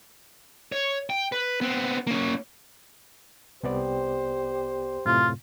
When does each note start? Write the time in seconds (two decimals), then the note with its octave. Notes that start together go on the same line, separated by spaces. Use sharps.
0.72 C#5
1.10 G5
1.32 B4
1.61 B3 C4
2.07 A#3 C#4
3.63 C2 B3 G4 C5 D5
5.05 F#2 A2 C3 F4